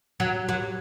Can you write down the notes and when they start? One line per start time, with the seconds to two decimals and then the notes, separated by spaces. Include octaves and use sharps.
0.20 F#3
0.49 F#3